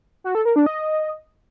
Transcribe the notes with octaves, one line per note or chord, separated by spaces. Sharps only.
F#4
A4
A#4
D4
D#5